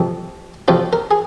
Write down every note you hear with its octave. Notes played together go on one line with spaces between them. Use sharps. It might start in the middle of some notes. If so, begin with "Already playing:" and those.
Already playing: F2 C3 F3
F2 C3 F3 F4
A#4
G#4